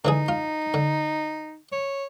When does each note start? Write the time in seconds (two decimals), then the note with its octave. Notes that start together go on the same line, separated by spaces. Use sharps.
0.05 D3 E3 D#4 G#4
0.28 F4
0.74 D3
1.72 C#5